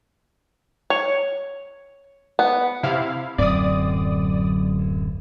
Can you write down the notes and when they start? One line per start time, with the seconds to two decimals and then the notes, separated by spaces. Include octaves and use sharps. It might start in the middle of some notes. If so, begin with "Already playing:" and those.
0.90 C#5
2.39 B3
2.83 C3 E4 F5
3.38 D1 F#2 C4 D5 D#6